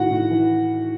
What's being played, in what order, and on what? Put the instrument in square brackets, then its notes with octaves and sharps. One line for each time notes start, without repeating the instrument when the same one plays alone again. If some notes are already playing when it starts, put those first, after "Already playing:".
Already playing: [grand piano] A2 D#3 F#4 F#5
A2
E3